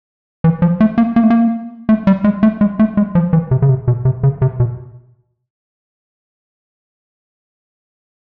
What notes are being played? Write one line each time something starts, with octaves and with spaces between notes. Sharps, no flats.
E3
F3
A3
A#3
A#3
A3
A#3
A3
G3
G#3
A3
G#3
A3
G#3
F3
E3
C3
C#3
C3
B2
C3
C#3
C3
B2